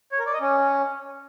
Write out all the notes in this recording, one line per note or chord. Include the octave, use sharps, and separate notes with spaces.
C#5
A#4
D5
D#5
C#4